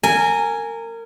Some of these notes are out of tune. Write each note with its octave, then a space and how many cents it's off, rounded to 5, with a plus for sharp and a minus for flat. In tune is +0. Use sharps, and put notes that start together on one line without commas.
A#4 -25 G#5 +0